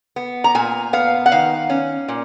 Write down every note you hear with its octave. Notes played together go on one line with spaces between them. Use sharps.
B3
A#5
A#2 G#5
B3 F5
F#5
D#3 F5
C#4
A#2